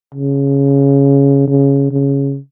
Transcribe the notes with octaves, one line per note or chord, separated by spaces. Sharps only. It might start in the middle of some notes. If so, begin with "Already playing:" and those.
C#3
C#3
C#3